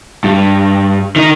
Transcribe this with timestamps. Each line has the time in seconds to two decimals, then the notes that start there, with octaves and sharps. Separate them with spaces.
0.24 G2
1.16 D#3 D#4